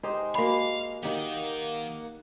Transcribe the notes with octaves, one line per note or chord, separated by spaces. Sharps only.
G#3 D#4 G4 C5
A#3 F#4 D5 F5 B5
D#3 A#3 D#4 G4 F#5